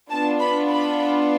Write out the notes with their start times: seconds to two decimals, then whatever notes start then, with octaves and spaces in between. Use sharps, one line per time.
0.11 B3 D4 F4 A5
0.40 B5
0.69 B5